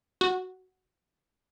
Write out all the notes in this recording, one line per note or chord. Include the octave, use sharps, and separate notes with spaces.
F#4